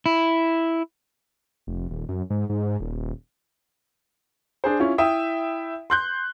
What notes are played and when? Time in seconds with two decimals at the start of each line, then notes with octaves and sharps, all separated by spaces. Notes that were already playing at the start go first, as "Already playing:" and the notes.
0.06 E4
1.67 F1
1.90 D#1
2.09 F#2
2.30 G#2
2.49 G#2
2.80 D#1
4.64 D4 G#4 C5
4.80 C#4 E4 F4
4.98 E4 E5 G5 D#6
5.90 C6 F#6 G6